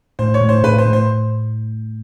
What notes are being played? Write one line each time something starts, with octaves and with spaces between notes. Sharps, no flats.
A2 C5
C#5
A2
C5
A2 B4
C5
A2
C5